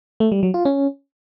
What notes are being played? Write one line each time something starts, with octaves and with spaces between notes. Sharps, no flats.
A3
G3
F#3
F4
C#4